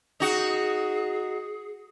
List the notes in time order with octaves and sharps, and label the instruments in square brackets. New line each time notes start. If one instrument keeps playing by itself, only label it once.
[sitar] D#4 F#4 [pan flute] G#4